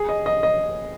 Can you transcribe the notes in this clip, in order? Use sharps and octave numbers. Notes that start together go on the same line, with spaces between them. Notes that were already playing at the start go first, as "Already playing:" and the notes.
Already playing: G#4
D#5
D#5
D#5